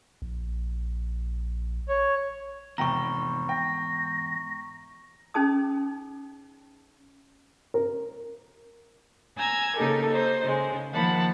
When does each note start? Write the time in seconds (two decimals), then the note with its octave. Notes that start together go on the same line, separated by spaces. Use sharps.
0.22 A#1
1.89 C#5
2.78 F1 E2 G#2 G5 A#5 C#6 A#6
3.49 G5 A#6
5.34 C#4 D#4 G#4 A5 D#6
7.74 A#4
9.36 G#5 A#5 E6 G#6
9.76 C#3 A#3 D#4 G4 A4 A#4
10.08 D#4 C5
10.43 C#3 G#3
10.92 D#3 F3 A#3 F#5 A5 B5